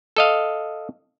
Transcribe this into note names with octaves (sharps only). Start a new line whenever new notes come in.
A4 D#5 F5